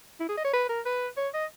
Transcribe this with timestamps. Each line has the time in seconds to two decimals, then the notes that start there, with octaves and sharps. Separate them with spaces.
0.20 E4
0.29 G#4
0.37 D#5
0.44 C#5
0.53 B4
0.69 A#4
0.85 B4
1.17 C#5
1.34 D#5